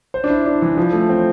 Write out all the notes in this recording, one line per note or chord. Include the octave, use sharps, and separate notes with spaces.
C5
D4
E4
D4
E3
F3
A3
C4